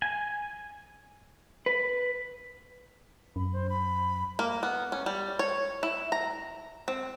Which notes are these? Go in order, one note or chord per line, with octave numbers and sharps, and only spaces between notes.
G#5
B4
F#2 B5
C5
B5
A#3
B3
C#4
G3
C#5
E4
A#5
C4